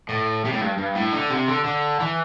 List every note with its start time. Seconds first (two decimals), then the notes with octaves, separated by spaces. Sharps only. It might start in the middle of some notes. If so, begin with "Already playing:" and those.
0.09 A2
0.45 C3
0.53 A2
0.62 G2
0.78 G2
0.96 A2
1.13 D3
1.30 C3
1.48 D3
1.64 D3
2.00 E3